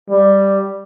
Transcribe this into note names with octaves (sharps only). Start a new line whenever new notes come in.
G3